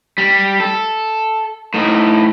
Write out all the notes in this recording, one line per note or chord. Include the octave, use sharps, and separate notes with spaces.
G3
A4
A2 D#4